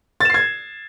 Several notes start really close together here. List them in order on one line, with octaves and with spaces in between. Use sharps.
A6 E7 C7 G#6